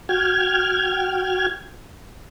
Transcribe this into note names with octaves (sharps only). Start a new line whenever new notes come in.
F#4 G5 F6 G#6